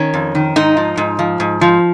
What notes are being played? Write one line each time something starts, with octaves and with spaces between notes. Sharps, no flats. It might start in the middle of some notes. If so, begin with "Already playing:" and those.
Already playing: D#3 C#4
F2
D#3
G#2 D#4
F3
G#2
F3
G#2
F3